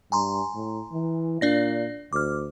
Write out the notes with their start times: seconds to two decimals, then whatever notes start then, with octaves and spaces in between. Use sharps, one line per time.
0.12 G2 G#5 A#5 C6
0.55 A2
0.93 E3
1.41 A#2 D4 D5 A#6
2.13 D2 D6 F6